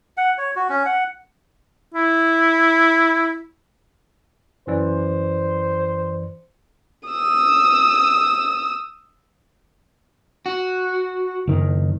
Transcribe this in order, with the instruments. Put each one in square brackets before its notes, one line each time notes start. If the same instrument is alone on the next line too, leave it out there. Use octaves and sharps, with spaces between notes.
[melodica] F#5
C#5
F#4
C#4
F#5
[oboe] E4
[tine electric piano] F#2 E3 D5 [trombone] C5
[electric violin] D#6 E6
[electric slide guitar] F#4
[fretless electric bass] F#1 D#3